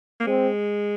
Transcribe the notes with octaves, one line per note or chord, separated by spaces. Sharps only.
A#3
G#3 C4